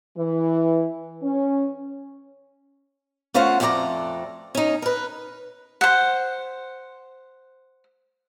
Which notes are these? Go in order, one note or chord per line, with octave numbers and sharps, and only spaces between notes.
E3
C#4
A3 C#4 F4 C5 F5 F#5
F2 A3 C#4 G4 D5 A#5
C#4 D#4
A#4 B4
C5 F#5